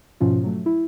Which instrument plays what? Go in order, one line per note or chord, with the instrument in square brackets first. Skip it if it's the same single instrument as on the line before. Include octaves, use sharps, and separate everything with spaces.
[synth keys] G#2 B2 F3 C#4 F4
F#3 A3
E4